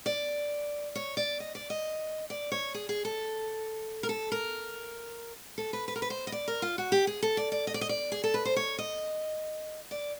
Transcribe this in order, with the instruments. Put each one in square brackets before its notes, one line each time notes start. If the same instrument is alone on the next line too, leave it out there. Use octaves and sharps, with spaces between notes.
[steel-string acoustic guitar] D5
C#5
D5
D#5
D5
D#5
D5
C#5
G#4
G#4
A4
A#4
A4
A#4
A4
B4
B4
A#4
B4
C5
D#5
D5
A#4
F4
F#4
G4
G#4
A4
D5
D5
D#5
D5
D#5
D5
G#4
A4
B4
C5
C#5
D#5
D5